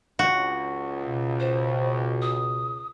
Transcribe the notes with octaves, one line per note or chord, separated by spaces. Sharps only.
C#2 F#4
B2
C5
D#6